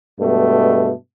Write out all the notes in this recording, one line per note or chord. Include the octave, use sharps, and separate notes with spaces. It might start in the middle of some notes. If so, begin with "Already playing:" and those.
G2 B2 G#3 A3